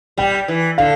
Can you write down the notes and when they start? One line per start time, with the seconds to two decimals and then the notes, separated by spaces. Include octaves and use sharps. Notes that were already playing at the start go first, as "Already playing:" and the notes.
0.17 G3 G5
0.48 E3
0.78 D3 F5